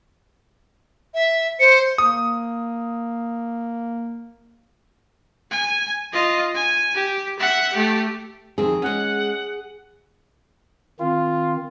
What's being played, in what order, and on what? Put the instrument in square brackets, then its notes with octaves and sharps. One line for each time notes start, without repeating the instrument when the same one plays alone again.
[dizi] E5
[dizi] C5 [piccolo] C#7
[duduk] A#3 [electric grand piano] D#6
[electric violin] G#5
F4 D#5
G#5
G4
E5 F#5
A3 G4
[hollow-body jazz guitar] F2 D#3 C4 [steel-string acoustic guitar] G#4
[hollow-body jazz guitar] G#3 C#4 [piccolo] F#5
[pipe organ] D#3 C4 [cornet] F4